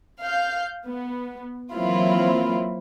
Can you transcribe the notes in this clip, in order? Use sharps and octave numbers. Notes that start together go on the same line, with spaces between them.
F5 G6
B3
E3 F#3 A#3 C4 E4 F4